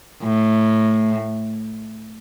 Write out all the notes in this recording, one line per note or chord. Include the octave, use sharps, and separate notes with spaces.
A2